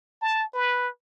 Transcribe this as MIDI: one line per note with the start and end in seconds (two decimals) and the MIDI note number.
0.22 0.45 81
0.53 0.88 71